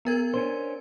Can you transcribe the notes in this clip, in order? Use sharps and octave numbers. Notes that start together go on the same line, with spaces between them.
B3 A#4 G#6
C#4 D4 C5